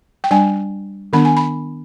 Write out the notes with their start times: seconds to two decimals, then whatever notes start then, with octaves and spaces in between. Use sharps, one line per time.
0.24 G5
0.31 G3 D4 G#5
1.13 D#3 B3 D4 B5
1.25 G#5
1.37 B5